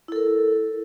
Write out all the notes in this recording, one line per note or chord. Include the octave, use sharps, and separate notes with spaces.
E4 A4 A#4